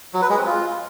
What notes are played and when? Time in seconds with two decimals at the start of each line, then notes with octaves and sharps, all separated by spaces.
0.14 F#3
0.22 B4
0.30 G#3
0.38 C4
0.46 F4